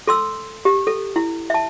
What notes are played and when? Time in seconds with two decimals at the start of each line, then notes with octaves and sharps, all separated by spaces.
0.08 A4 C6 E6
0.65 G4
0.87 A4
1.16 E4
1.50 E5 A5